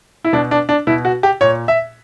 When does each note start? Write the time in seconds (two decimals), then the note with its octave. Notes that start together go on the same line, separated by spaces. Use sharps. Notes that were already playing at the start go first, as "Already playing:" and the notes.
0.24 E4
0.33 B2 D4
0.51 D4
0.69 D4
0.87 B2 E4
1.05 F#4
1.23 G4
1.41 A#2 C#5
1.68 E5